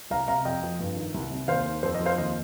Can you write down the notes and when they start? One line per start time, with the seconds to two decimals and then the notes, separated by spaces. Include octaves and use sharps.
0.10 C2 F5 A#5
0.28 C3 F5 A#5
0.45 F2 D#5 G5
0.63 F3
0.79 G2
0.96 D#3
1.14 C2
1.32 C3
1.48 D#2 C5 F5
1.65 D#3
1.83 F2 C5
1.94 D#5
2.00 F3
2.06 C5 F5
2.18 D#2 D#5